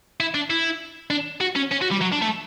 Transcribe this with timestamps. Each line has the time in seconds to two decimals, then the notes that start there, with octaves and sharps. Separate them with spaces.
0.20 E4
0.35 D4
0.50 E4
1.11 D4
1.41 F#4
1.55 C#4
1.71 C#4
1.81 F#4
1.91 G3
2.01 F#3
2.12 D4
2.22 A3